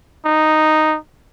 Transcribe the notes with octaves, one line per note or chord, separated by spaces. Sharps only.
D#4